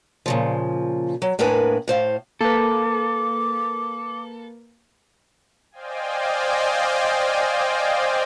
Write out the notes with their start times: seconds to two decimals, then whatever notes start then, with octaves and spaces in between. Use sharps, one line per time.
0.26 A#2 C#3 F3
1.22 F#3
1.39 A2 A#3 D4 A#4 B4 G#5
1.88 A2 C5 F5
2.41 A#3 A4 B4 D6
5.71 C5 D5 D#5 F5 G5 G#5